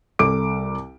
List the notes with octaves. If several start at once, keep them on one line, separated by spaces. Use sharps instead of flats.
C2 A4 D6 D7